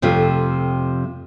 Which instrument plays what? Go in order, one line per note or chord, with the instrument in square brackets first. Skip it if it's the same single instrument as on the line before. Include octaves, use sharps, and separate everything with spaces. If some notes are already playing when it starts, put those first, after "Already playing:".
[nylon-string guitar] F2 C3 F3 A3